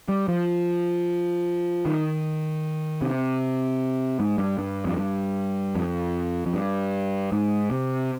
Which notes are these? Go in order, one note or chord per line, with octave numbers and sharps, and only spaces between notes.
G3
F3
D#3
C3
G#2
G2
G2
F2
G2
F2
F2
G2
G#2
C3